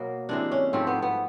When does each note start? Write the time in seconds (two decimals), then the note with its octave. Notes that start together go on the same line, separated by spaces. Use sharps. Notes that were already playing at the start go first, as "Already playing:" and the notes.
Already playing: B2 F#3 A#3
0.29 C3 E3 G#3 D4
0.52 C#4
0.73 G#2 F3 A3 C4
0.87 B3
1.02 B3